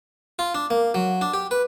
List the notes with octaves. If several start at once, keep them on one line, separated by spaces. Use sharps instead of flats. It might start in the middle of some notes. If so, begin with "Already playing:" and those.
F4
D4
A#3
F#3
D4
G4
B4